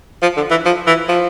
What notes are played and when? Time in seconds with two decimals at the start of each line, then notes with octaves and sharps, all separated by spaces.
0.22 F3
0.37 D3
0.51 E3
0.65 F3
0.87 E3
1.09 F3